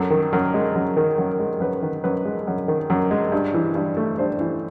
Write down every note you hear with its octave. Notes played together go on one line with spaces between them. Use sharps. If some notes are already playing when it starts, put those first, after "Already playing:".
Already playing: F#2 A4
D#3
F#2 A#4
G#3
F#2
D#3
F#2
G#3
F#2 B4
D#3
F#2 B4
G#3
F#2
D#3
F#2
G#3
G2
E3
G2
A3
G2 C5
E3